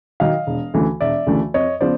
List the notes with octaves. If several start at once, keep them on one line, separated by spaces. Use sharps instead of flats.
D#3 F#3 D#5 F5
E1
D2 C#3 E3 A3
E1 D5 E5
D2 C#3 E3 A3
F2 C#5 D#5
C#3 F3 B3 C5 D5